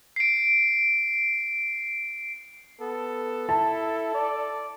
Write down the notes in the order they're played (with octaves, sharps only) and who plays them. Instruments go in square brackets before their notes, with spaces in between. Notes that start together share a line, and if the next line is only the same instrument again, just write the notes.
[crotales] C7 D7
[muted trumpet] B3 [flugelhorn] A4
[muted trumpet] E4 [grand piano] A5
[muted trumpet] D5